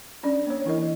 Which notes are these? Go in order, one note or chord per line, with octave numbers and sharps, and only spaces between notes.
C#4 D4 D5
A#3 C#5
E3 E4 A#4 D#5